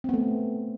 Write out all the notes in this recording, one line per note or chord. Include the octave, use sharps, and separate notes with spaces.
A3 B3 C4